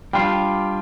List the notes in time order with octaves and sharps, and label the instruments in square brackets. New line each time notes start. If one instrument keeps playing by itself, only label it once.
[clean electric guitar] G3 D4 F4 [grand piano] G5